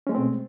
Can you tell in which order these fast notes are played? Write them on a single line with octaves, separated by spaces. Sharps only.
C#4 G#3 A3 C4 B2